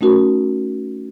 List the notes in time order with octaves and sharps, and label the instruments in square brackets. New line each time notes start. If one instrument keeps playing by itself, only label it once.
[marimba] A3 C#4 D#4 F#4 A#4